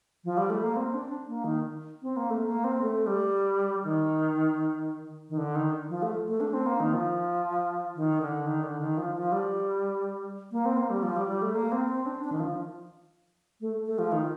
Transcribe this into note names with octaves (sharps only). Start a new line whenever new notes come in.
F3
G3
A3
A#3
C4
D4
A#3
D#3
C4
A#3
A3
A#3
C4
A3
G3
D#3
D#3
D3
D#3
F3
A3
A3
D4
C4
A#3
D#3
F3
D#3
D3
D#3
D3
D#3
F3
F3
G3
A#3
C4
A#3
G3
F3
G3
G3
A3
A#3
C4
C4
D4
D4
D#3
F3
A3
A3
F3
D#3